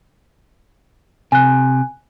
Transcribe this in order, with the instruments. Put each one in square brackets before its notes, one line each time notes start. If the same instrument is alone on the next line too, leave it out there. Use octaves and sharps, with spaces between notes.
[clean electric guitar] C3 [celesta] G#5 F#6